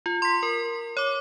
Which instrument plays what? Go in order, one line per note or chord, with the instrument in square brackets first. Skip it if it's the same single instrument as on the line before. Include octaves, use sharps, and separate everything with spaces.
[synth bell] F4
C6 B6
A#4
C#5 D6